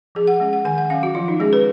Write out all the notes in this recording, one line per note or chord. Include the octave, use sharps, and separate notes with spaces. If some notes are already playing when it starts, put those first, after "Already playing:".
F3 G#4
F#5
G#3 C#4
F#5
D#3 G#5
F#5
F#3 C#4 F5
F#4
F3 F4
D#4
G#3 C#4 G#4
B4